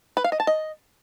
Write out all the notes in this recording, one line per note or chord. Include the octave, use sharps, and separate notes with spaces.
B4
F5
D#5
A5
D#5